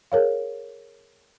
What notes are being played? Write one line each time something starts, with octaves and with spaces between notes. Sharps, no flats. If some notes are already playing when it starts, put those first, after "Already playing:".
G#4 A#4 C#5 F5